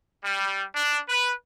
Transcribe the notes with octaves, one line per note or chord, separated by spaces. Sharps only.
G3
D4
B4